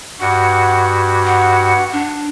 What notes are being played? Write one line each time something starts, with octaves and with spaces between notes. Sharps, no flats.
G2 F#4 F#5
F#5
D4